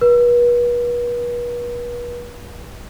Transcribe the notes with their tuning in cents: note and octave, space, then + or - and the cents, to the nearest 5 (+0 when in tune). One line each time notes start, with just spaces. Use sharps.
B4 -40